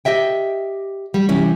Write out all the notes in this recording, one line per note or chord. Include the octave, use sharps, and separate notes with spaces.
G4 D#5 E5 G5
G3
C3 E3 G3 C#4